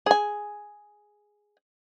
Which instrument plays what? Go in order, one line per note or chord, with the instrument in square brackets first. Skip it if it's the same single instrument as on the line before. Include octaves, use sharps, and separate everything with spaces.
[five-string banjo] G#4 G#5